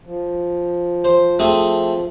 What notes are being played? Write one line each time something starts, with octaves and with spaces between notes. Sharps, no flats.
F3
C5
A3 C4 G#4